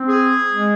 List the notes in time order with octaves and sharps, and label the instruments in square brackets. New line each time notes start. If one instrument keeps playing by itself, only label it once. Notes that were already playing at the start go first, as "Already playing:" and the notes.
Already playing: [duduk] C4
[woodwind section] G#4
[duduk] G#3